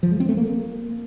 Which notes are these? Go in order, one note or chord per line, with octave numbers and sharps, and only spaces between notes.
F3
G#3
C4
A3
A#3